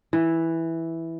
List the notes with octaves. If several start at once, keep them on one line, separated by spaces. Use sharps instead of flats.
E3